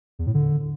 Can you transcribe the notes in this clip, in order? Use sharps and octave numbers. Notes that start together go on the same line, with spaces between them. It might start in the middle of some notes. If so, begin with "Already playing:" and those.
E2
A2
D3